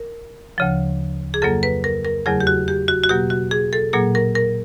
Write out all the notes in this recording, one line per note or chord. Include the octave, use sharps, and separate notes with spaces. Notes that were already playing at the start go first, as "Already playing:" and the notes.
Already playing: A#4
D2 C#3 F3
G#4
F2 C#3 F#3 A#3 A4
B4
A#4
A#4
E2 C#3 F#3 A3 G#4
G4
F#4
G4
F#4
F#4
B2 F#3 A#3 G4
F#4
G#4
A4
A#2 F#3 A#3 G#4
A#4
A#4